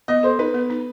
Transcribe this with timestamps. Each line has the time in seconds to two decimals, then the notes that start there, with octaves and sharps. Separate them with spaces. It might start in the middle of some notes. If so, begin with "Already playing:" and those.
0.08 B3 D#5
0.23 A4 C5
0.39 D#4 B4
0.54 B3
0.70 D#4